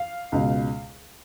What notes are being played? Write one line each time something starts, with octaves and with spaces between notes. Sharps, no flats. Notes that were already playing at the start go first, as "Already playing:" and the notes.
Already playing: F5
C#2 B2